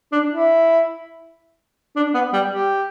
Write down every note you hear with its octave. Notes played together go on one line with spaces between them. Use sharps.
D4
E4
D4
B3
G3
G4